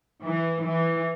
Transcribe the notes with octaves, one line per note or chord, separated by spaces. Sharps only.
E3
E3